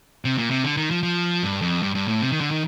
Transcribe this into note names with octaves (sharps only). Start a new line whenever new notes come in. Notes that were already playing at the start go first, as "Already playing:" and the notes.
C3
A#2
C3
D3
D#3
F3
F3
G2
F2
G2
G2
A2
C3
D#3
D3
D#3